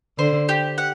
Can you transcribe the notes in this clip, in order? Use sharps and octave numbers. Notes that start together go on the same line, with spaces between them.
D3 C5
G4
F#5